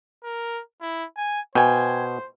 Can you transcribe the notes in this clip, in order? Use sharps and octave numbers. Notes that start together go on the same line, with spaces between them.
A#4
E4
G#5
B2 C5 G5 G#5